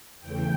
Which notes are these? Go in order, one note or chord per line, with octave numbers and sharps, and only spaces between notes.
E2 C#3 E3 A3 G5